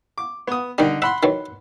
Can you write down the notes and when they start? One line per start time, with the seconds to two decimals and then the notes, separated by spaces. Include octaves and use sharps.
0.18 D6
0.47 B3 D#6
0.78 D3 D#3 G3 D#4
1.02 E5 F#5 B5 C6
1.23 D#3 E3 F#3